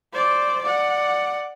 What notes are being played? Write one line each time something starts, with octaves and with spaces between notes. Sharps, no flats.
C5 D5
D5 F#5